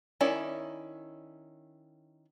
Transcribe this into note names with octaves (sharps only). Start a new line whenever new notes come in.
D#3 C#4 E4 D5